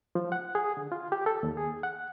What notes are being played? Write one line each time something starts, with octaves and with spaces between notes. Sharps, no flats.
F3
F#5
G#4
D3
F4
G4
A4
D#2
G#4
F#5